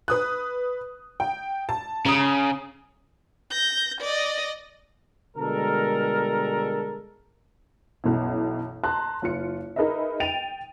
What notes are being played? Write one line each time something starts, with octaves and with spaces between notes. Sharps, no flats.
B4 D#6 F#6
G5
A5
C#3 A#5 D#6
G6 A#6
D5 D#5
B2 D3 G3 G#3 A4 A#4
B1 F#2 B2 E3
A5 A#5 C6 F#6
F#1 F4 C#7
D#4 G#4 A#4 B4 D#5 E5
G5 A6 D7 D#7 F7